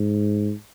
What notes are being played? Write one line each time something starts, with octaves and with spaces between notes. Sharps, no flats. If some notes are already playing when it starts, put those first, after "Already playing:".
Already playing: G#2